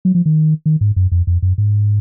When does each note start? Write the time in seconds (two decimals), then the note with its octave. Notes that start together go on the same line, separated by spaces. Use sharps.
0.05 F#3
0.15 F3
0.26 D#3
0.66 D#3
0.81 G#2
0.96 F#2
1.12 F2
1.27 F2
1.42 F#2
1.58 G#2